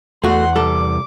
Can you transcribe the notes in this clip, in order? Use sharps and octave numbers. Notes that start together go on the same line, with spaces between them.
E2 A3 F#4 F#5 C6
C2 G3 A4 D6